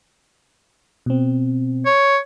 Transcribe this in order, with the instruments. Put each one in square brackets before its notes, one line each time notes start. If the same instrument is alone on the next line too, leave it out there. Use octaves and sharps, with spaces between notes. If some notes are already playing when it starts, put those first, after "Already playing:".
[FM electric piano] B2 C4
[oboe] C#5